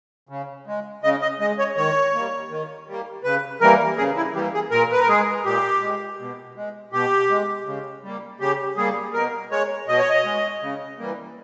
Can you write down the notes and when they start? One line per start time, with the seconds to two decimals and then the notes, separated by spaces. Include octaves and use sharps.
0.29 C#3
0.67 G#3
1.03 C#3 D#5
1.22 D#5
1.39 G#3 D#5
1.59 C#5
1.77 D#3 C#5
2.14 G3 A#3
2.50 D#3
2.87 G3 A#3
3.24 C#3 B4
3.61 E3 G3 A#3 A#4
3.97 C#3 G#4
4.16 E4
4.34 E3 G3 A#3 G4
4.54 G#4
4.71 A#2 A#4
4.92 B4
5.00 A#4
5.08 G#3 G#4
5.45 A#2 G4
5.82 G#3
6.19 B2
6.56 G#3
6.92 B2 G4
7.30 G#3
7.66 C#3
8.03 G3 A#3
8.40 C#3 G4
8.77 G3 A#3 G#4
9.13 B2 A#4
9.50 G#3 C#5
9.88 B2 D#5
9.99 C#5
10.09 D#5
10.25 G#3
10.61 C#3
10.99 E3 G3 A#3